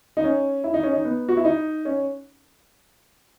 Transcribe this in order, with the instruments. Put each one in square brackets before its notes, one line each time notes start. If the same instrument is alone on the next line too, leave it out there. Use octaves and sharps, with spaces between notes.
[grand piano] D#4
C#4
E4
D#4
C#4
D#4
B3
F#4
E4
D#4
C#4